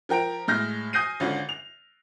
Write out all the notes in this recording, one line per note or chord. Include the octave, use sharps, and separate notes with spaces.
F3 A#4 G5 A#5 D7
A2 G#3 F6 G6 A#6
G#5 D#6 G6 A#6 C7 D#7
G#1 D3 C#4 F4
F7